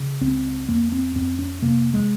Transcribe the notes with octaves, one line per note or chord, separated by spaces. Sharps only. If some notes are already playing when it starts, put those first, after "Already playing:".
Already playing: C#3
C#2 C4
F2 A#3
C4
F2 C4
C#4
C3 A#3
G#3